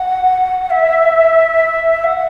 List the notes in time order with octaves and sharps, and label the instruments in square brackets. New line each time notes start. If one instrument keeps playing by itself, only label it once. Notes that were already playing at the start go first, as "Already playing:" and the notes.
Already playing: [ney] F#5
E5
F#5